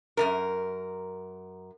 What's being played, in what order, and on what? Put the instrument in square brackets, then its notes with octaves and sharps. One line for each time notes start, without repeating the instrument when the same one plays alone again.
[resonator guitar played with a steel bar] F#2 C3 A#4